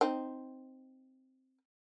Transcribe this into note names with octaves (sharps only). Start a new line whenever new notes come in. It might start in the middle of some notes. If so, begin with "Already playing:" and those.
C4 D#4